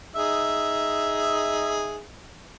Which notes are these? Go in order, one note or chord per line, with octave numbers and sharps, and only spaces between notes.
D#4 G#4 E5